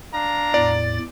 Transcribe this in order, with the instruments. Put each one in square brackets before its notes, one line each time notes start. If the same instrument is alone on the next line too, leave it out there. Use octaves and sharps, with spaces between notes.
[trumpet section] D4 F5 A#5
[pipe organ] E2 A2 A6 [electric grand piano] D5